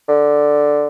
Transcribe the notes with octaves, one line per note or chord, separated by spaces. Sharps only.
D3